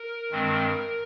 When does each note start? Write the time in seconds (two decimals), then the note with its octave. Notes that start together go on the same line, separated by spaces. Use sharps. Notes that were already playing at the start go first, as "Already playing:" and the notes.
Already playing: A#4
0.31 G2 D#3 G#3 C4